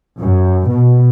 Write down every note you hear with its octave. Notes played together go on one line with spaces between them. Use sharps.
F#2
B2